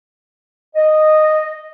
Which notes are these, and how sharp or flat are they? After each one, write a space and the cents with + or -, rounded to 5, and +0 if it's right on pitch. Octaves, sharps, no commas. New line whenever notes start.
D#5 -10